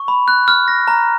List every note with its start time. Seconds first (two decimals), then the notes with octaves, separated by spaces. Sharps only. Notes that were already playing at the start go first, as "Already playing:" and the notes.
Already playing: C#6
0.08 B5
0.28 F#6
0.48 F6
0.68 A#6
0.88 A#5